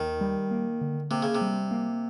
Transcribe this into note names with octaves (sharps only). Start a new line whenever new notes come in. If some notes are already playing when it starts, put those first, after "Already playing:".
Already playing: D#2 D#3
G3
A#3
D3
C3 A#3
C#3
C3
G3
A#3